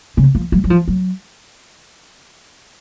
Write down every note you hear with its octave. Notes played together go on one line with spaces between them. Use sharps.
C#3
F3
F#3
F#3
F3
F#3